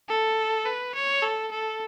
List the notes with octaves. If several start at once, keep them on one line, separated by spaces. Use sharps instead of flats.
A4
B4
C#5
A4
A4